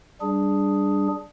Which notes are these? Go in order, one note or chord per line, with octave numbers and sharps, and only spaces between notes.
G3 D4 G#4